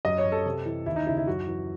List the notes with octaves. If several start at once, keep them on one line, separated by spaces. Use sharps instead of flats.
F#2 D#5
C#5
F#2
A4
C3
E3
D#2 E4
D#4
C#3 E4
E4
F#2 F#4
E3